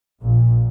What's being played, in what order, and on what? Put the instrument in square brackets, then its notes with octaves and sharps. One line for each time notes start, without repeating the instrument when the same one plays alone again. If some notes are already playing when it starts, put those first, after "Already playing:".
[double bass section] A#1 A#2